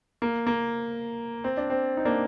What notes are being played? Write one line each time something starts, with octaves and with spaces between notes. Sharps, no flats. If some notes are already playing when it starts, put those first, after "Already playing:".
A#3
A#3
C4
D4
C4
D#4
A#3 D4